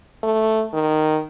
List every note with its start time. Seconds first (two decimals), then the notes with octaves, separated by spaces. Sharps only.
0.24 A3
0.74 D#3